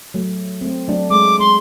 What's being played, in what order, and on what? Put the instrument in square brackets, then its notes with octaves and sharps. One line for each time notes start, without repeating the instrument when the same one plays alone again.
[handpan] F#3 A3
A3 C4
F#3 A3 D4
[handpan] G#3 [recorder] D6
[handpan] G#3 [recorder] C6